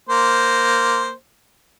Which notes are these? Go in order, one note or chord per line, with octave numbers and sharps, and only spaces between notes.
A#3 C5